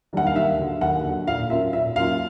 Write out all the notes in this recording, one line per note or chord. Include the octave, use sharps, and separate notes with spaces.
D#3 G3 A#3 D4 F#5
F5
D#2 E5
D3 F#3
D#2 F#5
D3 F#3
A#2 F5
F#3 A#3 C#4 F4 E5
A#2 E5
F#3 A#3 C#4 F4 F5